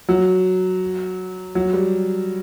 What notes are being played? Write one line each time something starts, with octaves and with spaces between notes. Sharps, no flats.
F#3
F#3
G3